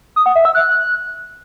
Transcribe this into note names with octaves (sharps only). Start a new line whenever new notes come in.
D#6
F#5
E5
E6
F#6